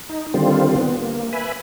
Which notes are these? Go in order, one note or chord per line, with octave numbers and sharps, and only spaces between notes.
D#4
D3 D#3 G3 C4 F4
B3
A#3
B4 E5 G#5 B5